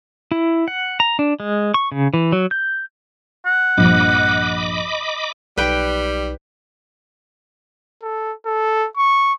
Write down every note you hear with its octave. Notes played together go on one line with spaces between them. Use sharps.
E4
F#5
A#5
D4
G#3
C#6
C#3
E3
F#3
G6
F#5
A#1 G2 F3 D#5 B5 D6
B1 G3 D#4 B4 G5
A4
A4
C#6